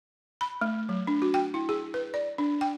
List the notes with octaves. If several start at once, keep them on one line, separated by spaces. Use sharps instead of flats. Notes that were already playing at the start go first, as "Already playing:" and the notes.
B5
A3
F#3
D4
F#4
G5
E4
G#4
B4
D5
D4
G5